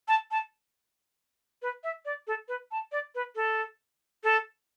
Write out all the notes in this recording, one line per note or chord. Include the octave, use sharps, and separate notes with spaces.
A5
A5
B4
E5
D5
A4
B4
A5
D5
B4
A4
A4